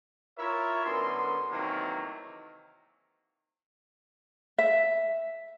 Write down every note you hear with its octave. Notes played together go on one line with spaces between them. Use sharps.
E4 F4 A#4 C#5 E5
F#2 D3 B3 C6
C3 D#3 E3 F#3 A3 A#3
E5